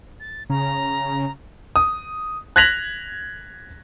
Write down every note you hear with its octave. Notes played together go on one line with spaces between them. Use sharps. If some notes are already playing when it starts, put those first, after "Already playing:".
A6
C#3 A#5
D#6
F#6 G#6 A#6 B6 F7 F#7